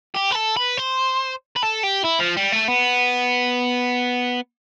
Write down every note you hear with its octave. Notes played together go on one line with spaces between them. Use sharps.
G4
B4
A4
B4
C5
B4
A4
G4
E4
F3
G3
A3
B3